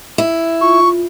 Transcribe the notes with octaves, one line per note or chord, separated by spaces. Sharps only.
E4
F4 C#6